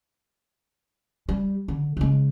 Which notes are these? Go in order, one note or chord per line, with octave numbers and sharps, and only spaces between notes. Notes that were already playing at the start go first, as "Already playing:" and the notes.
G3
D3
C#3 G#3